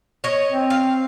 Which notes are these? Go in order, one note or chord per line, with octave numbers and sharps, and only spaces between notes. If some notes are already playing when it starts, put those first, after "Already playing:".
C#5 D#5
C4
F5